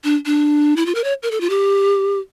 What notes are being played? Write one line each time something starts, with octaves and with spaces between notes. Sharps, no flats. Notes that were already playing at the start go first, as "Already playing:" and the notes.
D4
D4
E4
F4
A#4
C#5
A#4
A4
F4
G4